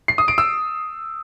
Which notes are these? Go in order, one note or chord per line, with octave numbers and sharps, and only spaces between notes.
C7
D#6
D7
E6